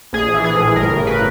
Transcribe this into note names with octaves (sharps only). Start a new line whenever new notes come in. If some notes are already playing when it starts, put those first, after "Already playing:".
A#1 G#4
E3
G#4
A2
G1 A#4
C#3
B4